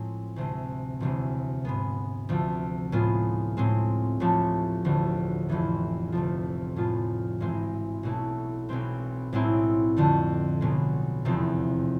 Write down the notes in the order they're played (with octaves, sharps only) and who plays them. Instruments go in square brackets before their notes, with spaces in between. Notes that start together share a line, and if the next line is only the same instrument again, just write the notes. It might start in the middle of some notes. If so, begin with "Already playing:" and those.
Already playing: [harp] A2 F3 G#3 C4
D2 C3 G#3
E1 D2 C3 G#3
G#2 G#3 B3
D2 C3 F3
A2 G#3 B3 F4
A2 G#3 C4
A1 A2 F3 A3
E1 D2 D3
F1 F2 E3 B3
D2 C3 F3
A2 F3 G#3 B3 F4
G#1 G#2 E3 G#3 C4
B1 B2 A3 E4
B1 B2 G#3 C4
B1 A2 G#3 C4 E4
F2 D3 A3
B1 B2 G#3
F1 E2 C3 F3